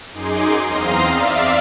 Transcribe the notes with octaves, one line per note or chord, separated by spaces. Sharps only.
F#2 D#4 G#4 C6 D6
E2 C4 F5 A#5 C6 D#6
D5 E5 F5